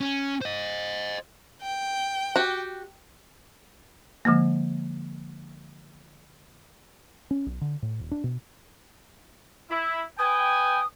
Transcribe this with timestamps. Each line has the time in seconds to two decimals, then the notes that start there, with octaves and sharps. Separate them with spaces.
0.01 C#4
0.42 C5 D#5
1.62 G5
2.36 F#4 G4
4.25 D3 F3 G#3 A#3
7.31 C#4
7.46 B1
7.61 D3
7.82 A2
7.99 D#1
8.11 D4
8.24 B2
9.70 E4
10.19 B4 G5 G#5 D#6